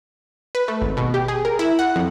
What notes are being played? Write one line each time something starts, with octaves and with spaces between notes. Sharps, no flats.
B4
A3
G#1
B2
G4
G#4
A#4
E4
F#5
F2